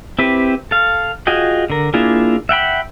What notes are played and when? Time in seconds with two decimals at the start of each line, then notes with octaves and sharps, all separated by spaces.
0.19 C4 E4 G4 B4
0.71 A4 F5
1.27 F4 F#4 G#4 D#5 G5
1.70 D3 A#4
1.94 A#3 D4 E4 F4 G#4
2.49 E5 F#5 G5 B5